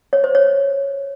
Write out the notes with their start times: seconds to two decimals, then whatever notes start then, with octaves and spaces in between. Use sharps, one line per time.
0.13 C#5
0.24 C5
0.35 C#5